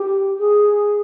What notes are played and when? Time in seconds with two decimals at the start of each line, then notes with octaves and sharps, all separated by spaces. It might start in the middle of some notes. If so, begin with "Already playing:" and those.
Already playing: G4
0.39 G#4